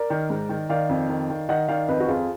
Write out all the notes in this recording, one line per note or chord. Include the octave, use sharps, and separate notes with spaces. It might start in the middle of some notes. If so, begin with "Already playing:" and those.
Already playing: A#4 D5
D#3
G#2
D#3
D#3 D5 F5
F2
D#3
D#3
D#3 D#5 F#5
D#3 D5 F5
F2 B4 D#5
F#4
F2 F4 G#4